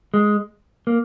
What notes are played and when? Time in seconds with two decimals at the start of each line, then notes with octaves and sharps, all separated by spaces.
0.14 G#3
0.87 A#3